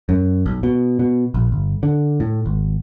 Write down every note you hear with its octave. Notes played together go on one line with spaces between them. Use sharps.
F#2
B1
B2
B2
A#1
G1
D3
A2
G#1